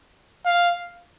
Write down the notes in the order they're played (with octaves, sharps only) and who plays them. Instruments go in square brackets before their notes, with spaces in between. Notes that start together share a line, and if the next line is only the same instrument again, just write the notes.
[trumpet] F5